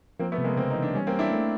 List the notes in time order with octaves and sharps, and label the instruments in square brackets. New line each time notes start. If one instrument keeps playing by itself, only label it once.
[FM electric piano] F3 [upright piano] A#3 C4
[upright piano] A3 B3
[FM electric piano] C3
[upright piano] G#3 A#3
[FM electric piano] C#3 [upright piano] A#3 C4
[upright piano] D#4
[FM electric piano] E3
[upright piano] D4
[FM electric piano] G3 [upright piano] C#4
[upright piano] A#3 C4
[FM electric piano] G3
[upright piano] D4 E4
[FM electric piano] A3